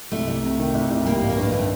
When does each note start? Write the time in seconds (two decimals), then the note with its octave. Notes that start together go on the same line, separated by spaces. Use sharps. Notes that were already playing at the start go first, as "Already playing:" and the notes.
0.12 C2 A3
0.27 C2
0.43 C3
0.59 D#3
0.74 C2
0.90 C2
1.05 G3 A#3
1.21 A1
1.30 A#3
1.37 G2
1.42 A#3
1.52 D#3 A3